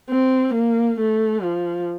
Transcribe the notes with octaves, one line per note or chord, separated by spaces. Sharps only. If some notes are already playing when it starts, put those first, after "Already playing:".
C4
A#3
A3
F3